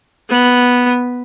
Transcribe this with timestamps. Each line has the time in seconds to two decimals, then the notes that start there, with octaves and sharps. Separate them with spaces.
0.29 B3